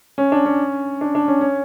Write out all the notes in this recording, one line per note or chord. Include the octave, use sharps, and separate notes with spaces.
C#4
D4
C#4
D4
D4
C#4
C#4